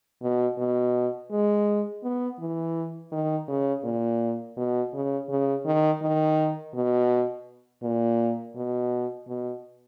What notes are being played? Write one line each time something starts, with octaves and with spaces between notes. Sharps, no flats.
B2
B2
G#3
B3
E3
D#3
C#3
A#2
B2
C#3
C#3
D#3
D#3
B2
A#2
B2
B2